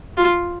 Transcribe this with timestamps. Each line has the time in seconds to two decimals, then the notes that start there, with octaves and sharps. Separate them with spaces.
0.17 F4